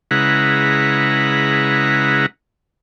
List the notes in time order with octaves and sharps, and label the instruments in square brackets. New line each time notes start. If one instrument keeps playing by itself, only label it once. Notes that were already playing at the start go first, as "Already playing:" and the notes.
[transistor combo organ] C#3 G#3 E4 B4 F#5 A#5